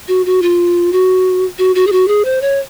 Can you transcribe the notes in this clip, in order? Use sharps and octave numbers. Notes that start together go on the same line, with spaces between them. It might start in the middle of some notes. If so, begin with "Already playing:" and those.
F#4
F#4
F4
F#4
F#4
F#4
G#4
F#4
G#4
C5
C#5